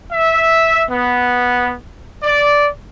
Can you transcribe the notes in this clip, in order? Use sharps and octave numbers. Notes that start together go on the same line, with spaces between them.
E5
B3
D5